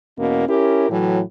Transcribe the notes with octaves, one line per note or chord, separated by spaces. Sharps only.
E2 B2 A#3 C#4
C#4 E4 G4 A#4
A2 E3 F#3